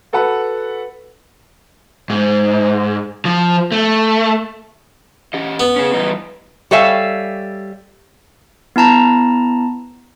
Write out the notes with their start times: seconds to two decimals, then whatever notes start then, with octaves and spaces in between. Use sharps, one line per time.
0.13 F#4 A4 B4 F#5 B5
2.10 G#2
3.25 F3
3.72 A3
5.34 C#4 G4 D#5
5.60 B3
5.76 C#4 G#4
5.94 E3 G3 D#4
6.71 G3 A4 C#5 E5 F5 G#5
8.76 B3 E4 A5 A#5